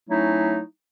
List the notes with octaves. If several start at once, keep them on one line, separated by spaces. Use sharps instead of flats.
F#3 A3 C#4 D#4 E4